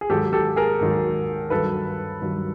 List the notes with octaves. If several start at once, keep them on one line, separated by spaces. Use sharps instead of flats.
G#4
G#2 D#3 F#3 G4 A4
G4 A4
G#4 A#4
G#2 D#3 F#3
G2 D#3 F#3 A4 B4
G2 D#3 F#3